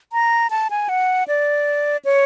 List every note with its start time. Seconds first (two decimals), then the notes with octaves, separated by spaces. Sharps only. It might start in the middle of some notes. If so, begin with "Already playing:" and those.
0.13 A#5
0.50 A5
0.70 G#5
0.89 F#5
1.28 D5
2.05 C#5